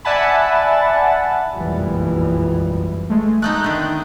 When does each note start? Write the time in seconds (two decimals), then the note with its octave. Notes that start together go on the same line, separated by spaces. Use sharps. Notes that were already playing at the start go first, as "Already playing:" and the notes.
0.05 D5 E5 F#5 G#5 A5 B5
1.55 F#1 B1 F2 G#2 E3 G3
3.10 G#3 A3
3.42 A3 B3 D#4 F#6 G6
3.64 D3 D#3